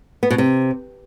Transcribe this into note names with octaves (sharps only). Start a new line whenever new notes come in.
B3
B2
C3